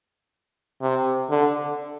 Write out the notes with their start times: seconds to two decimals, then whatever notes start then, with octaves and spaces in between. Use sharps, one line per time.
0.82 C3
1.30 D3